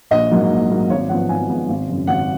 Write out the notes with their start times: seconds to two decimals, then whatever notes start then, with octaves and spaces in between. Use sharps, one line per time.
0.11 A#1 D#5
0.31 G#2 F#3 A#3
0.51 A#1
0.70 G#2 F#3 A#3
0.90 G#1 C#5
1.09 G#2 F3 B3 F#5
1.29 G#1 G#5
1.49 G#2 F3 B3
1.69 G#1
1.88 F#2 C#3
2.07 G#1 F#5